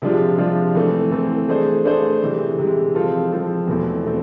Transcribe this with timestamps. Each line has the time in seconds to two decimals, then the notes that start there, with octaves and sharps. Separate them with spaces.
0.02 C3 F3 G#3 D4 F4
0.38 C3 F3 G#3 D4 F4
0.75 E3 A3 C4
1.11 E3 A3 C4
1.48 A3 D4 G#4 C5
1.85 A3 D4 G#4 C5
2.22 C3 E3 G#3
2.58 C3 E3 G#3
2.95 F3 G#3 C4 F4 A4
3.31 F3 G#3 C4 F4 A4
3.67 E2 B2 A3 C4 E4
4.05 B2 A3 C4